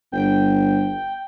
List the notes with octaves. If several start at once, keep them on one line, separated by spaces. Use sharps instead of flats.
G1 G5